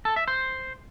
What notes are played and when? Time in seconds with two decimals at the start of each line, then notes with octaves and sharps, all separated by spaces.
0.05 A4
0.16 E5
0.28 C5